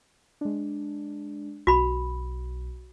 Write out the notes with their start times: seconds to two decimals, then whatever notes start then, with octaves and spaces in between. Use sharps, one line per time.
0.41 G#3 D4
1.67 B1 F#4 B5